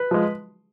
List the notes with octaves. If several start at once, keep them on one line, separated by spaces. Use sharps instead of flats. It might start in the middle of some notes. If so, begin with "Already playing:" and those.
Already playing: B4
F3 G#3